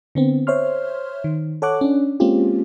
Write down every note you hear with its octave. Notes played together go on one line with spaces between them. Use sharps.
D3 B3 C4
C5 C#5 E5 C6 F6
D#3
A4 C#5 F#5 D6 F#6
C#4 D4
G#3 A#3 C4 C#4 F4 G4